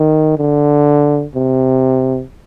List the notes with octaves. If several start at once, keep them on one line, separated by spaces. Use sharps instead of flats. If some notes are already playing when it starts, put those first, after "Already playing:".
Already playing: D#3
D3
C3